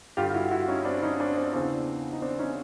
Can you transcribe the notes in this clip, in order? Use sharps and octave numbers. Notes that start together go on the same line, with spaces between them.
G2 D3 F4 G4
F4
E4 F#4
E4 F#4
C#4 D#4
C4 D4
C#4 D#4
C4 D4
C4 D4
E2 C#3 E3 C4 D4
D#4
C4 D4
C#4 D#4